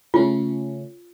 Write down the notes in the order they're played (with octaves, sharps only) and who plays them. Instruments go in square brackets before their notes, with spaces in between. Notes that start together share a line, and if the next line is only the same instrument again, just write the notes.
[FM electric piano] C#3 A3 C#4 [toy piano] F4